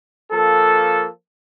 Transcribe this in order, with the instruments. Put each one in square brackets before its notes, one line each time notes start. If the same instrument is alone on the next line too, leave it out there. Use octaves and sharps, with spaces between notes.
[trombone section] F3 A#3 A4